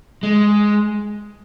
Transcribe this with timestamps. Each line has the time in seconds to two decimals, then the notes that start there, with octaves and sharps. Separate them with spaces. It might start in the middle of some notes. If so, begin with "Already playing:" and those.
0.23 G#3